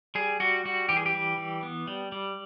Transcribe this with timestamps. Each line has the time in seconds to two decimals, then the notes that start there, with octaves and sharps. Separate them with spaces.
0.15 G3 G#4
0.40 G3 F#4
0.65 G3 F#4
0.89 E3 G4
0.97 G#4
1.06 G4
1.14 G3
1.38 E3
1.63 B3
1.87 G3
2.12 G3